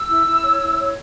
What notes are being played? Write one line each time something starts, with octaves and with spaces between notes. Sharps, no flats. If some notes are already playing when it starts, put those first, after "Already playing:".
Already playing: E6
E4
E4
C#5
E4
C#5